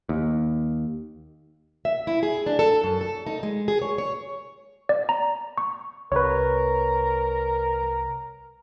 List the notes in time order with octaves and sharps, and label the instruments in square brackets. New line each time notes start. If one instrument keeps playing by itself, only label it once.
[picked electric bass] D#2
[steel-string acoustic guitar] E5
E4
G#4
D4
A4
F#2
A4
D#4
G#3
G#4
C#5
C#5
[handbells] D5
A#5
C#6
[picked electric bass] C2 [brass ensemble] A#4 A#5 [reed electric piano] B4 C#5